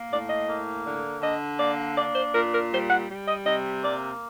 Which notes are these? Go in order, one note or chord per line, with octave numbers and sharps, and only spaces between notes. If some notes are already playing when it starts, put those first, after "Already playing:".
Already playing: A#3
A2 D5
D#5
A#3
D3
D3 D#5
A#3 D5
D4 D5
C5
A#2 A#4
A#4
G3 C5
F#5
G3
D#5
C3 D#5
A#3 D5